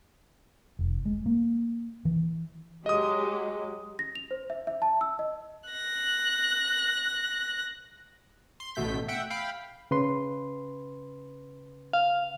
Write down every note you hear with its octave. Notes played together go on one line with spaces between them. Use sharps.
F1
G#3
A#3
E3
F#3 G#3 G4 D#5 D#6
A#6
F7
C5
E5
E5
A5
E6
D#5
F#6 A#6
C6
A1 B2 A3 G6 B6
E5 F#5 G5
F5 G5 B5
C#3 B4 C6
F5